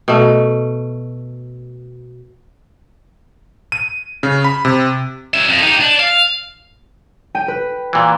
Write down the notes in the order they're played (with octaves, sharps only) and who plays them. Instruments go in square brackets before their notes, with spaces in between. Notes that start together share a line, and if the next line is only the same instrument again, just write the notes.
[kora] B2 A3
[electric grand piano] D#7
C#3
B5
C3
[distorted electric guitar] C#4 E5
F2
D#4 G4
D4
F5
[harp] G5 D#7
B4
[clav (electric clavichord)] A#2 E3